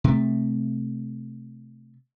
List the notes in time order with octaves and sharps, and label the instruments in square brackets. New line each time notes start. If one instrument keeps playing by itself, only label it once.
[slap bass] C3 A3